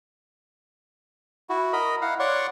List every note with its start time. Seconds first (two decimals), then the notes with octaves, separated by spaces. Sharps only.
1.50 E4 F#4
1.73 A#4 D#5 B5
2.02 E4 F5 F#5
2.19 C#5 D5 F#5 C6 C#6